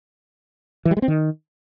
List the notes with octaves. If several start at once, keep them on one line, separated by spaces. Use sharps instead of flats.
E3
G3
G#3
C4
D#3